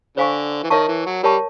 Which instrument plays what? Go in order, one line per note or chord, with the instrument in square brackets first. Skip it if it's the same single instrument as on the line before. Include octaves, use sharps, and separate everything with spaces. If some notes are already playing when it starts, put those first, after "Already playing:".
[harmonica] D3 [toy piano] C5 F5 G#5 C#6
[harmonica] E3
[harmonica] D#3 [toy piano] A#4 C#5 E5 A5 C#6
[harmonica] E3
F#3
[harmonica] G3 [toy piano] A#4 C#5 E5 A5 C#6